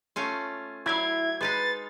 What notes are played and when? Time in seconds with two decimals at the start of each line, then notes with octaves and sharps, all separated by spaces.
0.16 A3 C#4 F4
0.86 F#3 E4 D5 F5 G#6
1.41 G#3 D#4 B4 F5 A6